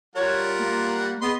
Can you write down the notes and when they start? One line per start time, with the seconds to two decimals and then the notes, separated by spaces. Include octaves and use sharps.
0.16 G3 F4 A#4 C#5 F#5
0.59 A#3
1.22 B3 G#4 B4 D#5 C6